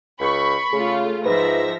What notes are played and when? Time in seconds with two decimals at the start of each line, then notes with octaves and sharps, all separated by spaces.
0.20 C#2 B5 C#6
0.73 C#3 A3 F4 G#4
1.26 G#2 F3 B4 E5 A#6